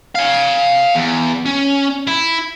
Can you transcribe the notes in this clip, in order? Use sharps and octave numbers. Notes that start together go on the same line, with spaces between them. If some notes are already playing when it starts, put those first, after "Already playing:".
F5 G#5
E2
C#4
E4